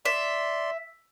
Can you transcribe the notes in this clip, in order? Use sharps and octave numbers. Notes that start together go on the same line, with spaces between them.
D5 E5 C6